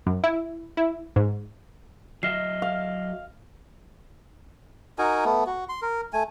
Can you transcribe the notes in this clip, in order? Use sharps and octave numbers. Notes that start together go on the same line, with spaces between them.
F#2
E4
E4
G#2
F#3 D#5 E5 F6 C7
F5
D#4 F#4 A#4 G#5
A3 B3
F#4
C6
A#4
A3 G#5